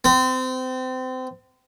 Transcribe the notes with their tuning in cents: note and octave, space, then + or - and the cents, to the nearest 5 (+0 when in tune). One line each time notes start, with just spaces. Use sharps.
C4 -30